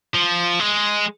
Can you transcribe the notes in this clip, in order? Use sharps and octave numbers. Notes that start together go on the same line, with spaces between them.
F3
G#3